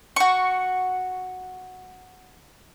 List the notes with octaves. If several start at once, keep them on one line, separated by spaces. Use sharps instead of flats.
F#4 C#6